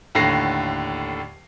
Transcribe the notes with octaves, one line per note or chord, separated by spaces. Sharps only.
D#2 A2 D3 A#6 C7